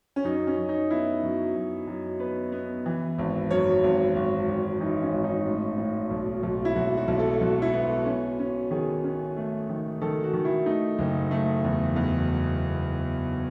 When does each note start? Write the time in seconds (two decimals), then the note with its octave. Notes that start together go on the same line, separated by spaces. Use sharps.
0.16 C#4
0.24 F#2 D#4
0.47 C#4
0.58 F#2
0.69 D#4
0.90 B3 E4
1.23 F#2
1.55 F#2
1.88 F#2
2.20 B3 B4
2.52 B3
2.86 E3
3.18 G#1
3.51 F#2 C#5
3.83 G#1
4.16 G#1
4.48 G#1
4.80 E3 D#4
5.02 C#4
5.14 G#1
5.24 D#4
5.46 A2
5.78 A2
6.10 B1
6.43 B1
6.65 E4
6.75 B1 F#4
6.97 F#4
7.08 B1
7.19 A4
7.41 B1 F#4
7.62 E4
7.74 B3
8.06 C#4
8.39 C#4
8.71 D#3 G#4
9.04 C#4
9.37 A3
9.69 D#3
10.01 D#3 A4
10.24 F#4
10.33 D#3
10.45 E4
10.66 A3 D#4
10.98 F#1
11.31 A3
11.64 E2
11.96 E2